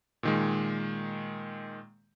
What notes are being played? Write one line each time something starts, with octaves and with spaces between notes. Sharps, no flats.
A#2 D#3 G#3